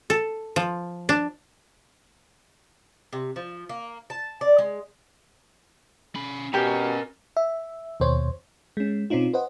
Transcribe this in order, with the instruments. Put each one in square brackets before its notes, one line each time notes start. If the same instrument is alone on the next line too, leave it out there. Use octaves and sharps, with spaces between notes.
[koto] A4
F3
D4
[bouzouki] C3
F3
A#3
A5
D5
G#3
[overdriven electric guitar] C#4 B5
[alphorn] B2 [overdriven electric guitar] C#4 [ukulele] G4 [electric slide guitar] A#4 G#5 A#5
[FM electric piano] E5
D#2 B2 C5 C#5
G#3 C#4
B2 C4 C#4 D#4 F4
B4 C5 D#5 F#5